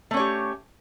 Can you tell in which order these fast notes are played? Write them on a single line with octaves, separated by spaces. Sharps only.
A3 C#4 C#5 G4